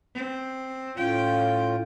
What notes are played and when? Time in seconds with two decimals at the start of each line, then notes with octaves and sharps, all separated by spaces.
0.14 C4
0.97 A2 C#4 F4 G5